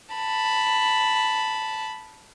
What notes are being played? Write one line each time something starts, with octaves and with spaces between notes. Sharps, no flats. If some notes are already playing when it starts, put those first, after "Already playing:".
A5 B5